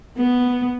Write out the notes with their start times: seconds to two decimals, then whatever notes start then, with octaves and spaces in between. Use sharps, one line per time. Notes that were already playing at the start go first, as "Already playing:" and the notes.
0.17 B3